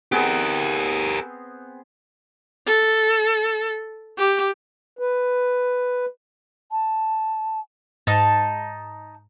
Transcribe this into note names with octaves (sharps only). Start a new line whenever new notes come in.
B3 C4 G4 G#4 A#4
A4
G4
B4
A5
G#2 D#4 A5